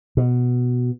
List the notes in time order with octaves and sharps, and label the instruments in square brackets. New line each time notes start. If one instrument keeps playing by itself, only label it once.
[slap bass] B2